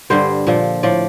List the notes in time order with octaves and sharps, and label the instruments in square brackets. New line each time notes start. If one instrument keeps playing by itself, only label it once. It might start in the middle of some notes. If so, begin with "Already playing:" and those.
[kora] G2 D3 G3 C5
A#2 F3
A2 F3 D5